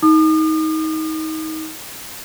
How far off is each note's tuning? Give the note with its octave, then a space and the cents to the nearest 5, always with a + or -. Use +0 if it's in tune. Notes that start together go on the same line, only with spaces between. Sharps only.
D#4 +25 D#6 -45